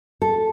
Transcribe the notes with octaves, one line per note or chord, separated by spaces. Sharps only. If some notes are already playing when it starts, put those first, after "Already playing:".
A4